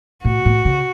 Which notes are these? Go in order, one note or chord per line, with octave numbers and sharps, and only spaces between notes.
A2 F#4
A2
C#3